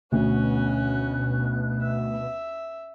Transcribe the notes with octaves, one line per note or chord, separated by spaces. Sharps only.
D2 B2 C#4 F#4 F#6
E5